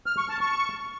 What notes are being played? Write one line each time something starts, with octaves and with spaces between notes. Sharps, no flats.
F6
C#6
A5
C#6